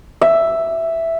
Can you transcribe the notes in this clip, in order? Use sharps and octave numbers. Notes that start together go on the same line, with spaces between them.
E5